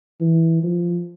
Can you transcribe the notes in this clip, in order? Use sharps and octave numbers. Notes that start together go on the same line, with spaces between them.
E3
F3